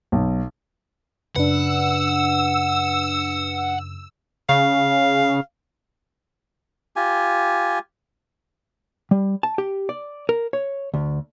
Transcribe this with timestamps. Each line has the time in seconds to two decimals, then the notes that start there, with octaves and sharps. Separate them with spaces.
0.12 B1
1.36 F#2 C#3 D4 B4 F#5 E6
4.49 C#3 F5
6.96 F4 G4 G#5
9.11 G3
9.43 A5
9.58 G4
9.89 D5
10.29 A#4
10.53 C#5
10.94 D2